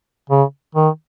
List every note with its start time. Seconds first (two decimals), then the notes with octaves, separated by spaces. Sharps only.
0.30 C#3
0.75 D#3